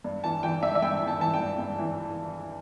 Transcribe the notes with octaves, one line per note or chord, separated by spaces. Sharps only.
G2
E3 A5
E3 G5
G2 E5
E5
G2 G5
E3
A5
E3 A5
G5
G2
G2
E3